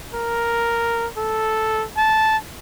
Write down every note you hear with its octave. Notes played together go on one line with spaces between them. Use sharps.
A#4
A4
A5